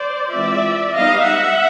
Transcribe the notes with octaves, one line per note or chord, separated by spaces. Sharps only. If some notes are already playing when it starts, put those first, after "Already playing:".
Already playing: C5 D5
E3 G#3 C4 F4 D5 E5
G3 B3 D#4 D#5 F5
E5 F#5